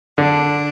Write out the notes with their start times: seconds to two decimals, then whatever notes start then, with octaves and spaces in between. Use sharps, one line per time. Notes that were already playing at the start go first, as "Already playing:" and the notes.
0.18 D3 D4